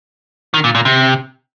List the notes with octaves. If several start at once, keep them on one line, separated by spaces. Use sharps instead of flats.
D#3
A#2
A#2
C3